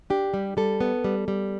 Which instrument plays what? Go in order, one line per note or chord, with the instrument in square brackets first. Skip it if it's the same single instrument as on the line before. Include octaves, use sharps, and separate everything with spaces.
[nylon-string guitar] D4 G4
G3
G3 A4
B3
G3
G3